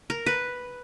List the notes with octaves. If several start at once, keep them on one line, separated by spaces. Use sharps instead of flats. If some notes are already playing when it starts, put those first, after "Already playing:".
A#4
B4